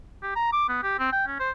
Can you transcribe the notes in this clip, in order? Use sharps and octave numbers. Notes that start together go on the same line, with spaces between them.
G4
A#5
D6
B3
G4
C4
G5
C#4
C5